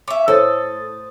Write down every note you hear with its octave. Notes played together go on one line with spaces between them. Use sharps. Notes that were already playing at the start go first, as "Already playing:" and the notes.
C#4 E5 D6
A2 A4 C5 D#6 A6